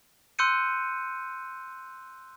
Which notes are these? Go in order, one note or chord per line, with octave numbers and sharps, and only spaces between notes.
C6 E6 F#6 G6 C#7 D#7